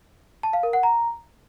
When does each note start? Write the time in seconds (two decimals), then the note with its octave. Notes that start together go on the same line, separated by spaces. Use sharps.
0.43 A5
0.53 F5
0.63 A#4
0.73 F#5
0.83 A#5